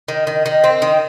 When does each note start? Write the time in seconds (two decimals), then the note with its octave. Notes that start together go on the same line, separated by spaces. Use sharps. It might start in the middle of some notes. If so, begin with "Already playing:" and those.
0.08 D#3
0.27 D#3
0.46 D#3
0.64 C4
0.82 D#3